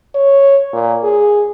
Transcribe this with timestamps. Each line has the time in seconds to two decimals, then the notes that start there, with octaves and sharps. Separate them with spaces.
0.15 C#5
0.73 A#2
1.04 G#4